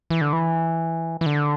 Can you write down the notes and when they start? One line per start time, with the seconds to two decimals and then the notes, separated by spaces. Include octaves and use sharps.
0.10 E3
0.21 D3
0.33 E3
1.21 E3
1.26 D3